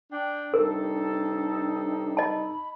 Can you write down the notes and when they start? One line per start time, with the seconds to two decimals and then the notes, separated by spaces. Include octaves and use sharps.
0.12 D4 G5
0.54 G2 C3 D4 D#4 A4 A#4
2.17 D#5 A5 B5